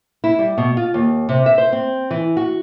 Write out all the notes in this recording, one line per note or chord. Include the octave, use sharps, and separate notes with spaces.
E4
G3
B2
F4
D#2
C3
E5
C5
C4
E3
F#4